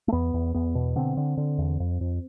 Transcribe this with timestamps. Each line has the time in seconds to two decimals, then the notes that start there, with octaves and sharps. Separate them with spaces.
0.08 A3
0.12 E2 B3
0.34 E2
0.54 E2 B3
0.75 B2
0.96 D3 C4
1.17 D3
1.37 D3
1.58 E2
1.80 F2
2.01 F2